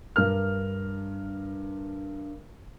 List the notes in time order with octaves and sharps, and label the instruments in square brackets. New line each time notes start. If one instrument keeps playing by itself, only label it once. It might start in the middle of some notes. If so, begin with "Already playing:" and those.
[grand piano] G2 A#4 F6